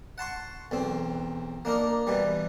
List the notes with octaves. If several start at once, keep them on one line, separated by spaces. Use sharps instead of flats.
F#5 A5 C6 C#6
B1 E2 C4
A#3 D4 D#4 A#4
B2 E3 G3